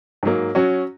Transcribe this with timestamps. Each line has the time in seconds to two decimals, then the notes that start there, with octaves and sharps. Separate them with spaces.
0.23 G#2 F#3 A#3
0.55 F#3 C#4 F#4